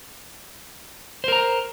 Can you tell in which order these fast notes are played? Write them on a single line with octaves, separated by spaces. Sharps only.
C5 A#4 A#5